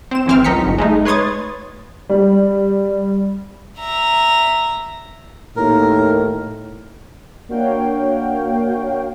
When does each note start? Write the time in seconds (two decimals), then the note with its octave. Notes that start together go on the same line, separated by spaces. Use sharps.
0.11 C4 E7
0.26 G#1 E3 C4 F6
0.44 C#2 F#2 D#4 B6 C#7
0.65 G1
0.78 G#3 A3 D#4
1.05 B4 C#5 C6 D#6 G#6 A6
2.10 G3
3.80 E5 A#5
5.56 D#2 A2 A#4
7.49 A#3 D4 F#4 C#5 F5 G5